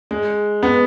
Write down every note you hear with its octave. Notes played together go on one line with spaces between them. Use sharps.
G#3
B3